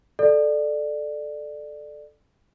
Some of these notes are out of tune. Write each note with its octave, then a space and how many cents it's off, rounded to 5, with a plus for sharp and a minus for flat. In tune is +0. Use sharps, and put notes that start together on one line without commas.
A4 -10 D5 +20